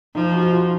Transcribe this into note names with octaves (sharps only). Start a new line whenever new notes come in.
F3 D#4
F#4
F4